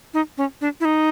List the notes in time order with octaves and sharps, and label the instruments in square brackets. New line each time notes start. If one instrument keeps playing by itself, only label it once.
[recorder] D#4
C#4
D4
E4
D#4